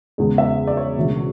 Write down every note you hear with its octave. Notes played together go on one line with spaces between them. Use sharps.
E2 C#3 G#3
E5
D5
C#5
E1 D2 C#3 G#3